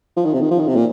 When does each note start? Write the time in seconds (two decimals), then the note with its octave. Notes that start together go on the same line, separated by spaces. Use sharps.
0.16 F3
0.25 D#3
0.34 C3
0.41 D#3
0.51 F3
0.59 D#3
0.67 C3
0.76 A#2